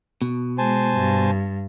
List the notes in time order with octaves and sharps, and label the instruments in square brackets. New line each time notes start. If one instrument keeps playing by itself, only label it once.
[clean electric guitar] B2
[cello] G#3 [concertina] C5 G#5 A5
[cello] G2